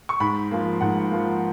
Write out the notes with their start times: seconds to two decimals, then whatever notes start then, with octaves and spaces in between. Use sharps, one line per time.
0.09 C#6
0.20 G#2 B5
0.51 F3 A#3
0.81 G#2 F#5
1.11 F3 A#3